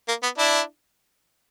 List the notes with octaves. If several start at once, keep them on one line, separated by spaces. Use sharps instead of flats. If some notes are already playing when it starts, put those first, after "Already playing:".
A#3
B3
D4 E4